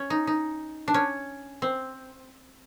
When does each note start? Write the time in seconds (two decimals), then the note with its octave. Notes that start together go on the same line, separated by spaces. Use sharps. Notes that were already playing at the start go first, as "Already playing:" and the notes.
Already playing: C#4
0.10 D#4
0.27 D#4
0.88 D4
0.94 C#4
1.62 C4